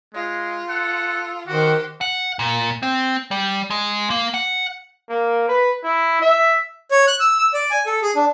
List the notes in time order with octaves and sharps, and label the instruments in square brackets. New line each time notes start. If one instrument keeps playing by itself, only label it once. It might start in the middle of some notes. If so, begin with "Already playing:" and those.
[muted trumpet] G#3 [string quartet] F4
[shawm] A4 [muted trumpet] F#5
[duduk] D#3 [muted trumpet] F#4 [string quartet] G4 C5 [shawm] F#5
[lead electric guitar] F#5
A#2
C4
G3
G#3
A#3
F#5
[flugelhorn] A#3
B4
E4
E5
[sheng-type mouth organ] C#5
F#6
E6
E6
D5
G#5
A4
G#4
D4